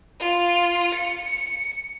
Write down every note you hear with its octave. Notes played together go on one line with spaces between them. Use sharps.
F4
C#7